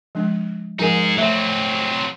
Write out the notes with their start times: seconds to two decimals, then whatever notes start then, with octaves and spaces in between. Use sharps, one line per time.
0.15 F3 G#3 D4
0.79 F3 G#3 D#4 G#4 A#4 G#5
1.18 F#3 A3 C4 E5